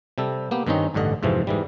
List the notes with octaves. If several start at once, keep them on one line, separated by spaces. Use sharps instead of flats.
C3 G3 A4
A#3 B3 G4
G2 D#3 C4 C#4 D#4 D#5
A1 G2 D3 D#5
F2 G#2 C3 E3 F3
G#2 E3 G3